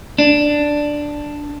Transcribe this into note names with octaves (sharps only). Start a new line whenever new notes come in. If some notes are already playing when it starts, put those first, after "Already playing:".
D4